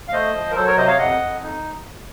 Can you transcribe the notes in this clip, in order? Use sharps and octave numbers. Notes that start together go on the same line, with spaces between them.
F5
A3 C5 D#5
F3
A#4
F#3 A4 C5
A#4 C#5
C3 C5 D#5
C#5 F5
F2 D#5 F#5
F2
D#4